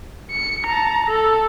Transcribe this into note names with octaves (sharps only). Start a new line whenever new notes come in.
C#7
A5 A#5
A4